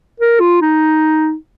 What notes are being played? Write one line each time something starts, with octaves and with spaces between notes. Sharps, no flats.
A#4
F4
D#4